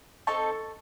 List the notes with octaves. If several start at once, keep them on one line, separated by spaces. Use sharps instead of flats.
C4 D#4 A4 A5 C#6